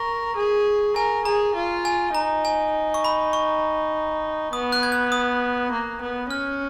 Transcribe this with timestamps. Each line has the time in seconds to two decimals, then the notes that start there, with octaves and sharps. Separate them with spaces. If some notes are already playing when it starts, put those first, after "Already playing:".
Already playing: A#4 C#6
0.36 G#4
0.96 A#4 G#5
1.25 G#4 A#5
1.55 F4
1.85 G#5
2.15 D#4 A#5
2.45 G#5
2.94 C#6
3.05 B5
3.33 C#6
4.53 B3 D#6
4.72 F#6
4.83 G#6
4.92 F#6
5.12 D#6
5.72 A#3
6.01 B3
6.30 C#4 F6